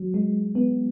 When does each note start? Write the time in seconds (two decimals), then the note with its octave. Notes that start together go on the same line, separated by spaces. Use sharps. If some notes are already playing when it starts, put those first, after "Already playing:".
Already playing: F#3
0.14 G#3
0.55 B3